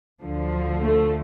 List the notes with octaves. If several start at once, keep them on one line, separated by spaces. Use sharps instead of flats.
D2 D3 F3
A3